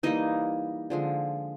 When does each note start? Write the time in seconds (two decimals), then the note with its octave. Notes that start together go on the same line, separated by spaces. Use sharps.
0.03 E3 G3 A#3 D#4 D#5
0.90 D3 F3 G#3